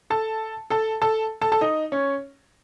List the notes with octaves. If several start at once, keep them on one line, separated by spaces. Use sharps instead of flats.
A4 A5
A4 A5
A4 A5
A4 A5
A4 A5
D#4 D#5
C#4 C#5